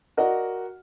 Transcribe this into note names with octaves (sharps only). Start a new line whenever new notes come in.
F#4 A#4 D5 D#5 F#5